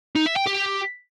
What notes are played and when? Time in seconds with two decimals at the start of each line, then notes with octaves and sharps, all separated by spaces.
0.15 D#4
0.26 E5
0.37 G5
0.47 G4